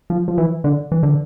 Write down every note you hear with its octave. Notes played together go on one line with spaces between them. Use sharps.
F3
F3
E3
D3
E3
D3